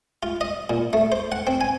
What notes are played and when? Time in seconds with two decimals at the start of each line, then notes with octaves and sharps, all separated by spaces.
0.23 F4
0.41 D#5
0.70 A#2
0.93 A3
1.12 C5
1.32 F#5
1.47 C4
1.61 G#5